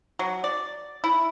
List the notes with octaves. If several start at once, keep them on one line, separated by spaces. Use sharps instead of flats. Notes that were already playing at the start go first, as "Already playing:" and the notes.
F#3
D5
E4